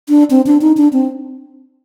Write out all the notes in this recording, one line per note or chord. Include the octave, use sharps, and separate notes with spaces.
D4
C4
D4
D#4
D4
C4